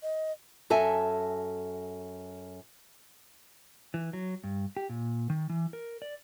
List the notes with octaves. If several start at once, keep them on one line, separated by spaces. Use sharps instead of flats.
D#5
F#2 A4 E5 G#5
E3
F#3
G2
G4
A#2
D#3
E3
A#4
D5